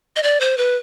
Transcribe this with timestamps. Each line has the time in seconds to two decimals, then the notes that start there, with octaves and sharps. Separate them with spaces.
0.16 D#5
0.23 D5
0.40 C5
0.58 B4